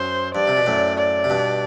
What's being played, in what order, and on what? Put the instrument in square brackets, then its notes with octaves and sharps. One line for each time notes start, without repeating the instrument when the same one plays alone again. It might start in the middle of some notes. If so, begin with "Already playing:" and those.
Already playing: [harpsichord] F#2 [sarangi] C5
[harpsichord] G2 [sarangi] D5
[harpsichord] C3
B2
F#2 A2
[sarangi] D5
[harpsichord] C3
G2 B2